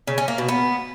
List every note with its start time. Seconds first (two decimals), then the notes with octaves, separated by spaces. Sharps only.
0.07 C#3
0.18 C#4
0.28 A#3
0.38 B2
0.48 B3